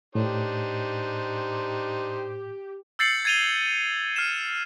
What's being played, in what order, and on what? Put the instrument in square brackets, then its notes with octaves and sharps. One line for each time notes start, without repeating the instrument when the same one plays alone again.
[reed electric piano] A2 [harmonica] D4 D#4 C5 [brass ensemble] G4
[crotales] E6 G6 A6 C7 C#7 F#7
G#6 A6 D#7 F7 G7
F6 C7 E7